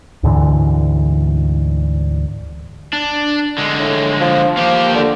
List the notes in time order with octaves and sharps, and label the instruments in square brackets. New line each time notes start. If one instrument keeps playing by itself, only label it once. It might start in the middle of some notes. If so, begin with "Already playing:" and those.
[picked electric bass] D2 G#2 D3 E3
[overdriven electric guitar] D4
D3 G#3
[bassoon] A2
F3
[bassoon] F3 [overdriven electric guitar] A#3 G4
[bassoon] D3